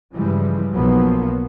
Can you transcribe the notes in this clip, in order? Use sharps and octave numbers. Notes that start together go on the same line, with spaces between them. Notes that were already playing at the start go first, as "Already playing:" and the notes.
G2 C#3 E3 F3 G3 G#3
B1 F3 F#3 A#3 B3